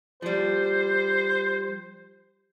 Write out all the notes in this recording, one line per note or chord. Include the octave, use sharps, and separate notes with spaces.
F3 G3 C5